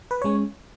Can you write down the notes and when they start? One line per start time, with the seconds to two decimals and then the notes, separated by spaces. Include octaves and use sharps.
0.11 B4
0.22 G#3 C#4 C#5